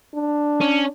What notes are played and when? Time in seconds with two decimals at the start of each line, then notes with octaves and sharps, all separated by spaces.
0.14 D4
0.61 C#4